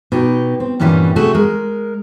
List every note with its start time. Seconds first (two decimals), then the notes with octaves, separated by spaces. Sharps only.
0.12 B2 D#4 G4
0.60 C4
0.80 G2 A#2 E3 G3 B3 C#4
1.16 C3 A3 F#4 G#4 A4
1.35 G#3 A#4